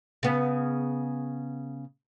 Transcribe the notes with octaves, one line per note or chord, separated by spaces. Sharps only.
C#3 B3